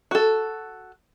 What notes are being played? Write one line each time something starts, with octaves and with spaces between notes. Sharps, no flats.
F#4 A4